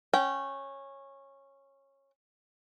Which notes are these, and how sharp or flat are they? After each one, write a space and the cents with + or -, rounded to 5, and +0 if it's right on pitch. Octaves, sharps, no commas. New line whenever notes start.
C#4 -15 G5 -25